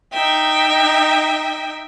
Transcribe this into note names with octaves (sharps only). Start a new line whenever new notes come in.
D#4 E5 G5